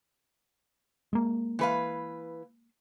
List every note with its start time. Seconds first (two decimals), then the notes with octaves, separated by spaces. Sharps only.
1.13 G#3 A#3
1.59 E3 B4 F5